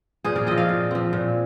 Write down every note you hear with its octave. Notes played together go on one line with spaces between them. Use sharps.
A#2 G#4 C5
A#4 D5
F3 C4 D#5
D5 F5
A#2
F3 C4
A#2